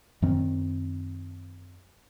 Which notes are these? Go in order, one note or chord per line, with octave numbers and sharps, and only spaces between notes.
F#2 D#3 C4